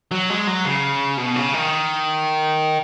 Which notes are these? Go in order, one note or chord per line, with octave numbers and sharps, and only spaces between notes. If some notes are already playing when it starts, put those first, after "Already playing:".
F#3
G#3
F#3
C#3
B2
C#3
D#3